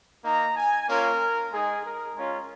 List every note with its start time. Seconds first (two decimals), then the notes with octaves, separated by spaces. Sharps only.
0.24 A#3 D#4 A#5
0.56 G#5
0.87 A#3 C#4 F4 A#4
1.52 G#3 D#4 G#4
1.84 A#4
2.16 G#3 C#4 F4